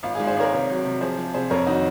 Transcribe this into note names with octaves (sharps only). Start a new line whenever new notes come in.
G#1 F4
G#2 F4 G#4
G#4 C5
G#1 A#4 C#5
C3
F#3
C3
F3 G#4 C5
F3
C3 G#4 C5
F2 A#4 C#5
D#3 D#4 F#4